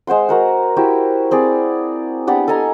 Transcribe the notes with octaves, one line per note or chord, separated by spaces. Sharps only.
G#3 C5 F#5 C6
F#4 A#4 F#5
E4 F#4 G4 C5
C4 G#4 D5
B3 D4 G4 F#5
A4 D#5 G#5 A#5